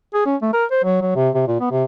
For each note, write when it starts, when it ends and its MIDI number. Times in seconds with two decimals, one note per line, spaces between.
0.14 0.24 68
0.26 0.36 61
0.42 0.50 57
0.53 0.65 70
0.71 0.79 72
0.84 0.98 54
1.01 1.11 54
1.16 1.29 48
1.34 1.43 48
1.48 1.56 46
1.60 1.71 59
1.71 1.84 48